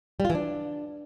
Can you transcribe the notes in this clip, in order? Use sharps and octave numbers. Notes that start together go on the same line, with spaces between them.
G3
F4
E3
D4